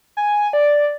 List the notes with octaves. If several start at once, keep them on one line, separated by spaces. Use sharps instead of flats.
G#5
D5